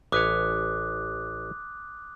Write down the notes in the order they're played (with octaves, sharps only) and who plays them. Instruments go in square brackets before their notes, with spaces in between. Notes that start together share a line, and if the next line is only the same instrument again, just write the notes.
[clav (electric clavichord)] A1 B4 C#5 [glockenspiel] D6 D#6 F#6